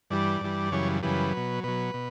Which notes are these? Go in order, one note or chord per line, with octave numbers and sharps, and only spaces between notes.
G2 E3 G3 D5
G2 E3 G3
F#2 C#3 E3 G3 C#5
F#2 C#3 E3 G3 B4
B2 F#3
B2 F#3 B4
B2